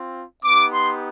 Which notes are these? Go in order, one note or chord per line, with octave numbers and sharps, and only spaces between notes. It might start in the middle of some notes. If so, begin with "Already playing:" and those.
Already playing: C4 F4
B3 D#4 G4 D6
C6